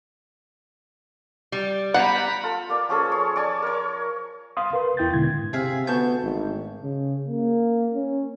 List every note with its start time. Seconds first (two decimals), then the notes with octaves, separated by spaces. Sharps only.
1.52 G3
1.94 G3 B3 F#5 A#5 B5
2.43 F4 A4
2.70 A#3 D5
2.89 F3 C#4 G#4 A4
3.12 C#5
3.36 C#5 D5 G#5 A5
3.62 A#4 C#5
4.57 F5 C6 D#6
4.73 A#4 B4 C6
4.97 E2 E4 G5 G6 A6
5.13 G#2 B2 D3 G#6
5.53 C3 C4 G#4 E5 F5
5.87 D2 B3 A5 C#6 G6
6.23 G#1
6.82 C#3
7.28 A#3
7.94 C#4